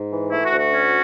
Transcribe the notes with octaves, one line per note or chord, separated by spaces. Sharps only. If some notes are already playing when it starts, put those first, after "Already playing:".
Already playing: G#2
E3
A3 E4
F#4
D2
F#4
C#4